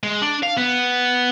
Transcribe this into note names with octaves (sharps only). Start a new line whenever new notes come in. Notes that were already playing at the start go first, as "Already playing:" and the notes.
G#3
D4
F5
B3